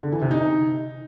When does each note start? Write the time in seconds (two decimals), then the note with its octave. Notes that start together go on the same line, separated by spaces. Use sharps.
0.03 D3
0.12 E3
0.22 C3
0.31 D#4